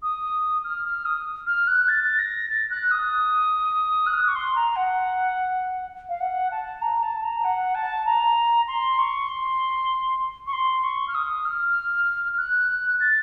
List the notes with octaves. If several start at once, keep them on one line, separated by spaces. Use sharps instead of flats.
D#6
F6
F6
D#6
F6
F#6
A6
A#6
A6
F#6
D#6
F#6
F6
D#6
C#6
C6
A#5
F#5
F5
F#5
A5
A#5
A5
A#5
F#5
A5
A#5
C6
C#6
C6
C#6
C6
C#6
F6
D#6
F6
F#6
A6